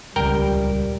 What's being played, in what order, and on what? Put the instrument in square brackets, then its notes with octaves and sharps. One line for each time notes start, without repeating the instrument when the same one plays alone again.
[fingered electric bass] D#1 C#2 [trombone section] G3 [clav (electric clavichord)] A#4 G5